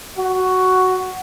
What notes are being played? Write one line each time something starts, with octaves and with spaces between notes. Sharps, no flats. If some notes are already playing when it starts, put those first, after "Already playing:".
F#4